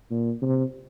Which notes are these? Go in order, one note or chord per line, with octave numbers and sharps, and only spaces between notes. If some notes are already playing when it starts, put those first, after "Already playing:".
A#2
C3